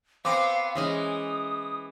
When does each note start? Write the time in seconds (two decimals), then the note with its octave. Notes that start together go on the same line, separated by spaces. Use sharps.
0.25 B3 C4 F5 D6
0.75 E3 G#3 C#4 E5 D#6